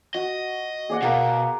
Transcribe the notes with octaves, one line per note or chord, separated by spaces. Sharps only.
F#4 D#5
A#3 G#4 D5 F#5
B2 A#4 F5 F#5